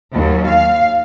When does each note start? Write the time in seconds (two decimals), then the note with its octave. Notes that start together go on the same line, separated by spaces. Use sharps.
0.13 D#2 F#3
0.47 F5